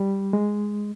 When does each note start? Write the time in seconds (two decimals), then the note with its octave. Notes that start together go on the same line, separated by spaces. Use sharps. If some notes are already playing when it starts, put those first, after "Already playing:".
Already playing: G3
0.33 G#3